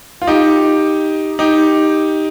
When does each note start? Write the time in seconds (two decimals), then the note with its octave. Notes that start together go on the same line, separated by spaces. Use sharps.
0.22 F4
0.27 D#4 G4
1.39 D#4 G4